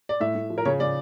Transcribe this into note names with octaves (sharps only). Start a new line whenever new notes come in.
D5
A2 E5
A2
F3
A#4
C#3 C#5
C#3 D5